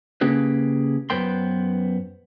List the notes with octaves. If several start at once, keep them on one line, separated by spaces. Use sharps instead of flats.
C#3 A#3 C#4 G4 G#4 B4
F#2 B3 B4 C5 G5 C6